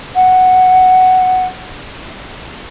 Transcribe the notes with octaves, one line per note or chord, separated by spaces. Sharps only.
F#5